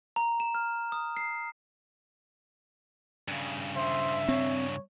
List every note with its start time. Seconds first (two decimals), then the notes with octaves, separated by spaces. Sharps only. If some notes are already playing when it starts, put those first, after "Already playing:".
0.16 A#5
0.40 E7
0.55 F6
0.92 D#6
1.17 C7
3.28 G2 C#3
3.76 C5 E5
4.29 C4 C#5